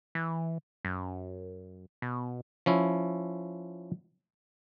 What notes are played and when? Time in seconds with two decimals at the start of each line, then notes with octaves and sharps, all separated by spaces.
0.15 E3
0.85 F#2
2.02 B2
2.66 F3 C#4 E4